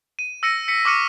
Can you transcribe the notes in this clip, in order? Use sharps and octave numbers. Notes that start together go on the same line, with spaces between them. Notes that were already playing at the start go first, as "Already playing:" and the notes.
D#7
E6 A#6 C#7 D#7
B6 C#7
C#6 D6 E6 F6 C#7 D#7